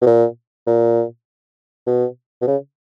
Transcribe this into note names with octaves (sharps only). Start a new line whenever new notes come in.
B2
A#2
A#2
B2
B2
C#3